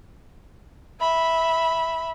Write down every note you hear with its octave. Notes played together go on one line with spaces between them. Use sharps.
E5 B5